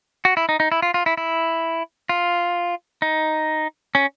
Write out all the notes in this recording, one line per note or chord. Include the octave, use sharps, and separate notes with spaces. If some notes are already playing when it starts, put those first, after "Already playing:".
F#4
E4
D#4
D#4
E4
F4
F4
E4
E4
F4
D#4
C#4